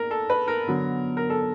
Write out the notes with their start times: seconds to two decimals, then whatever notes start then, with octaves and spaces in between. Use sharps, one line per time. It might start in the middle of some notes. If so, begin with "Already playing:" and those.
Already playing: A#3 A#4
0.11 A4
0.30 B4
0.48 A#4
0.67 D3 F#3 B3
1.17 A#4
1.30 A4